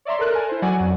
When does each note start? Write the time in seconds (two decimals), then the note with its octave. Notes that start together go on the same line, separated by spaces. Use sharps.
0.05 C#5 D5 E5 A#5 C6
0.19 A4 A#4 F#6
0.33 A#4 G#5 A5
0.49 E4 C5
0.62 F#3 D5 F#5 G#5
0.79 F2 F#3